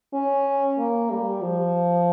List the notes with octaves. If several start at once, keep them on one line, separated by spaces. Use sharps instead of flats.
C#4
A#3
G3
F3